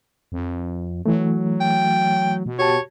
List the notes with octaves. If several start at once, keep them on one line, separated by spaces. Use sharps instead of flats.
F2
E3 F#3 A3
G5
B2
F#4 G4 C#5 A5